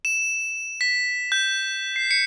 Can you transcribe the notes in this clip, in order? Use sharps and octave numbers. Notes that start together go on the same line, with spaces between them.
E7
B6
G6
C7
C#7